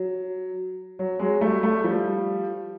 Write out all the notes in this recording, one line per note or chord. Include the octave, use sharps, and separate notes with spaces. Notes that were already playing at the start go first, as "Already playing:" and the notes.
Already playing: F#3
F#3
F#3 G#3
G3 A3
G3 A3
F3 G3